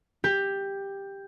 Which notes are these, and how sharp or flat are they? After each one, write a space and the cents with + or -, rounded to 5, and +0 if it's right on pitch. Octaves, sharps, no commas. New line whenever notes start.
G4 +10